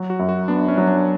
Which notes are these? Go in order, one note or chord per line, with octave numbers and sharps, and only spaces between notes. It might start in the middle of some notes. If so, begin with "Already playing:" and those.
Already playing: F#3
F#4
F#2
F#4
B3 D4
C#4
F#3
D4